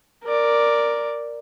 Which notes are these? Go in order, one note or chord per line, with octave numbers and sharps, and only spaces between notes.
A#4 D5